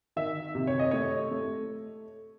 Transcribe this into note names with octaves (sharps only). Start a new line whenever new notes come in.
D#3 E5
C3
C#5
D#5
A3 C#5
A3